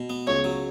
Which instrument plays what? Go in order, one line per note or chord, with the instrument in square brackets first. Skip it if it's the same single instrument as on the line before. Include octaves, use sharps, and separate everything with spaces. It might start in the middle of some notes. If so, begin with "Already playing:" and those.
Already playing: [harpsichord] B2
B3
[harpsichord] C#2 [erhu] C#5
[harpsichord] F#3